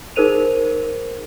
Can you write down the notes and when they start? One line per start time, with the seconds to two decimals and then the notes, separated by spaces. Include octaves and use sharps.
0.16 D#4 G#4 A#4 C5 D#7 F7